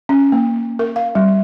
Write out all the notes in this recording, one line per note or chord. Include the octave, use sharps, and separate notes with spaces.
C#4
A#3
A#4
F5
G3